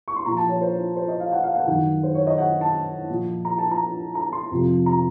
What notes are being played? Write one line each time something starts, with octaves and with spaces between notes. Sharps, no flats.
C#6
C6
A#2 F3 A#5
A5
C#5
C5
C5
D#5
F5
F#5
F5
F#5
F#2 D#3 F#5
C5
C#5
D#5
F#5
A5
A#2 F3
A#5
A5
A#5
A#5
C6
F2 C3 F3
A#5